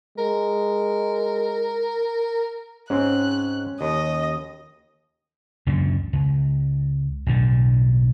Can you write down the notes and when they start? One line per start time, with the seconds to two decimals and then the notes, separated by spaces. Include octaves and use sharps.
0.18 G#3 A#4
2.90 G#2 C4 C#4 F#6
3.81 D#2 D#5
5.67 C#2 F#2 A#2 D3
6.13 C#2
7.26 B1 A2 D3